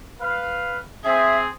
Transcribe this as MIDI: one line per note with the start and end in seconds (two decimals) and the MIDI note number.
0.19 0.76 71
0.19 0.76 77
1.04 1.47 60
1.04 1.47 68
1.04 1.37 76